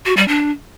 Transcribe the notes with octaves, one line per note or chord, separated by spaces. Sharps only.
F#4
G3
D4